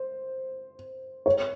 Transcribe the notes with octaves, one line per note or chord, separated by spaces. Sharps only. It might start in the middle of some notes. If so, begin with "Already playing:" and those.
Already playing: C5
C#5